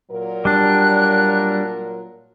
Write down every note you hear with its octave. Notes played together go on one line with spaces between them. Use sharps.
A#2 F#3 A#4
G3 D4 F#6